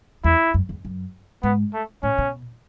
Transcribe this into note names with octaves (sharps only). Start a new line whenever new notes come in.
E2 E4
F#2
E2
F#2
G#2 B3
A3
A2 C#4
B2